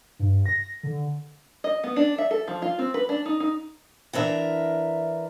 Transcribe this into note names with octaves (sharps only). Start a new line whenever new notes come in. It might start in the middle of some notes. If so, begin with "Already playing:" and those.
G2
A#6
D3
D#5
B3
D4
E5
A4
F3
F4
C4
B4
D4
D#4
D#4
E3 D4 A#4 E5